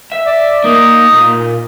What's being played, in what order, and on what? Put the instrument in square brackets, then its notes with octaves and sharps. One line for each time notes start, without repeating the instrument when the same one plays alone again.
[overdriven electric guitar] E5
[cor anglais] D5
[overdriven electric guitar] A#3 [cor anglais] D#4
[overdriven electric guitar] A#2